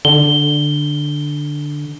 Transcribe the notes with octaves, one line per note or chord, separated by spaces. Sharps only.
D3 G7